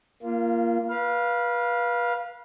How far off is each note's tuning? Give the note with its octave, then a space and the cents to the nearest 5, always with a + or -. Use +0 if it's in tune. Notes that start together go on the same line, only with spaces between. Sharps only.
A#3 +0 F4 -25
B4 -30 F5 +0